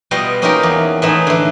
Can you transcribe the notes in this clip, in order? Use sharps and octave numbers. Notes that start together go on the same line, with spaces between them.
B2 G3 F4 D#5 G5 C6
A#3 C#4 D#4 F4 G4 A#4
E2
A2 E3 G#3 D#4 E5
D3 E3